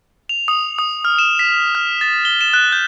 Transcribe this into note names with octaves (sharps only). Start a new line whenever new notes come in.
F7
D#6
D#6
F6
E7
B6
F6
A6
G7
E7
F#6
G6